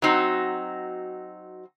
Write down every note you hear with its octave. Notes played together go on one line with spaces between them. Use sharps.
F#3 C4 D#4 F#4